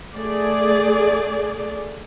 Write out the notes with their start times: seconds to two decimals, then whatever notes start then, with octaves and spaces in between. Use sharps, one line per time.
0.15 A3 G#4 D5